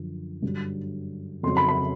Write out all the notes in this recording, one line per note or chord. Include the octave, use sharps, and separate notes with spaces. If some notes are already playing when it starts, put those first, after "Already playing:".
Already playing: F#2 D3 F3
G2 D3 F#3
F2 C#3 F#3 C6
B5
B5